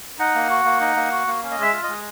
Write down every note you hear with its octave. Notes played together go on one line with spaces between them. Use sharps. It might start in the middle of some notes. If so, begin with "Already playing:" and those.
D#4 F#5
A#3
F#4
A#3
D#4
A#3
F#4
A#3
C#4
D#5
G#3 E5
F4
D#5
G#3